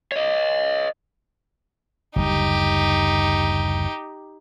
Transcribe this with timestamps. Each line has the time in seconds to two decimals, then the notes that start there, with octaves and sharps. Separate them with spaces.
0.12 C#5 D#5
2.16 F#1 D2 G3 D#4 G4